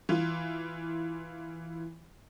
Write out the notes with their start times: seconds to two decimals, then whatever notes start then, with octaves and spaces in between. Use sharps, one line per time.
0.09 E3 F4